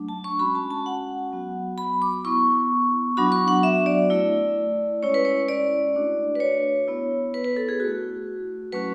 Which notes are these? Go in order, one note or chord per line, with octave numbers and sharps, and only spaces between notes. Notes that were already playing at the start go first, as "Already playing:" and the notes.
Already playing: F#3 A3 D4
A5
C#6
G#3 C#4 F#4 B5
A5
A5
F#5
F#3 B3 F#4
B5
D6
B3 E4 C#6
F#3 B3 D4 F#4 B5
C#6
F#5
E5
D5
A3 E4
G#3 C#4 E4 C#5
B4
C#5
D5
A3 D4 F#4
B4
C#5
B3 E4
B4
B4
A4
G#4
A3 E4 F#4
F#3 A3 C#4 F#4 B4